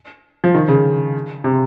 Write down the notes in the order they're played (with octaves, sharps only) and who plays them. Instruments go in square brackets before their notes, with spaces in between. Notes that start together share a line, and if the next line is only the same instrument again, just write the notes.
[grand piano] F3
D#3
C#3
C3